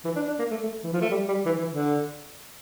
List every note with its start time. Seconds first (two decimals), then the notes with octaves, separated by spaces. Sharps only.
0.05 E3
0.16 D4
0.28 D4
0.39 A#3
0.51 A3
0.63 A3
0.84 E3
0.93 F3
1.01 A3
1.10 G3
1.28 G3
1.46 E3
1.58 E3
1.70 D3